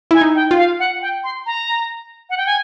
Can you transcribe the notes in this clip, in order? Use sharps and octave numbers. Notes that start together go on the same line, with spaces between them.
E4 G#5
D#4
G5
F4
F5
F#5
G5
C6
A#5
F#5
G5
G#5